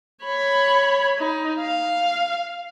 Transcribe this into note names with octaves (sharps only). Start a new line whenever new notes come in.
C#5 B5
D#4
F5